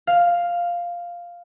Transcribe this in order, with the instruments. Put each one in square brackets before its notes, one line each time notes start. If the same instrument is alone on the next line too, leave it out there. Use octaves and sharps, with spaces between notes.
[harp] F5